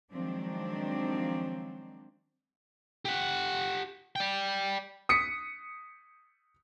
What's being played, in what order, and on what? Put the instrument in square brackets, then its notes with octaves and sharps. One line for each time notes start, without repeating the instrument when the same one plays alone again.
[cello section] D#3 F3 F#3 G#3 C4 D4
[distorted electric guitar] G4 F#5
D5 G5
[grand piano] D#6 B6 C#7